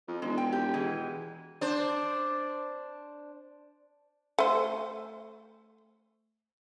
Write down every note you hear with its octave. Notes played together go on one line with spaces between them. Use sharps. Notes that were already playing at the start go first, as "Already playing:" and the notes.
F2
E1 G#3
G5
G4
B2 E3 G#3
D4 C5
A3 C5